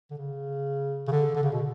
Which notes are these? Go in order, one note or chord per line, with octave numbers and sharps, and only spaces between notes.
D3
C#3
C#3
D3
D3
C#3
B2